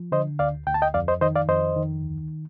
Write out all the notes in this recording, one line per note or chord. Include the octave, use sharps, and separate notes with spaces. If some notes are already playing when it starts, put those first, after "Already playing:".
Already playing: F3
D3 C5 D#5
D2 D5 F5
D2 G5
A5
D#5 G5
F2 D5 F5
C5 D#5
D#3 C5 D#5
D5 F5
F2 C5 D#5
D#3
D2